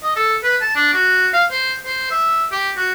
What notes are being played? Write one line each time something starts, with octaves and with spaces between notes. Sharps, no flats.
D#5
A4
B4
A5
D4
F#4
F5
C5
C5
E5
G4
F#4